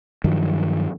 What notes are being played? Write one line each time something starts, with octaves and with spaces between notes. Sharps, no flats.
G2 D#3 F3 F#3